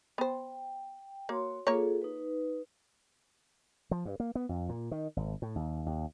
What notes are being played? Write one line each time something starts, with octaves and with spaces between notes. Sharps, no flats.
B3 C5 G5
A#3 F#4 C#5 C6
A#3 F4 G#4 A4 C#5
D#4 B4
F3
G2
A#3
B3
F2
A#2
D#3
G#1
A2
D#2
D#2